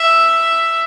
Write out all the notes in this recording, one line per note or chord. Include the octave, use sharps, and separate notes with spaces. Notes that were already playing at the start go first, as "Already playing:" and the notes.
Already playing: E5